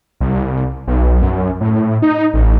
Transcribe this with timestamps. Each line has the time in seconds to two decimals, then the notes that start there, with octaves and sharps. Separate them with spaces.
0.20 C2
0.87 B1
1.22 F#2
1.61 A2
2.02 D#4
2.34 A1